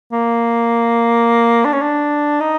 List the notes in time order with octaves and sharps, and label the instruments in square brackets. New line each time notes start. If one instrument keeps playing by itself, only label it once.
[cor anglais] A#3
D4
C#4
D4
D#4